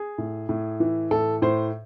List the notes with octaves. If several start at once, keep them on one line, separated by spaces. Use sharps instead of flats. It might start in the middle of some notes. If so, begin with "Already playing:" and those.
Already playing: G#4
A2
A2
E3
A2 A4
A2 C5